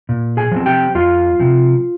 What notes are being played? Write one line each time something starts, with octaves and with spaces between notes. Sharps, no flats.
A#2
G#4 G#5
F3 C4
G4 G5
F2 F4 F5
C3 F3